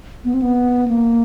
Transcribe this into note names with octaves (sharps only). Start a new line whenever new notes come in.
B3
C4
B3
A#3